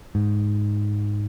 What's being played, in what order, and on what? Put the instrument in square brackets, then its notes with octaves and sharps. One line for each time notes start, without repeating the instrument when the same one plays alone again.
[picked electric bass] G#2